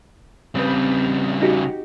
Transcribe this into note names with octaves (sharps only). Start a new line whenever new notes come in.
C#3 G3 C4 B4
D#4 F#4 G4